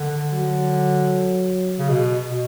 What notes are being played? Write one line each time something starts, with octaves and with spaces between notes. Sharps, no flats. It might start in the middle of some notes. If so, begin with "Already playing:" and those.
Already playing: D3
F#3
C#3
B2
B2